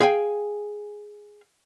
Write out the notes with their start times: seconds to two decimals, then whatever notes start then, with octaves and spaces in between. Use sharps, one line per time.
0.01 G#4 F5 G5 G#5